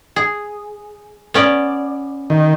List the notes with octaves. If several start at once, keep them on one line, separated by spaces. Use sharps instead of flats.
G#4
B3 C#4 D5
D#3